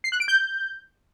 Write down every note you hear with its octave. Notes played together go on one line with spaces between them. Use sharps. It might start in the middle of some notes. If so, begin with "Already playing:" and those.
C7
F#6
D7
G6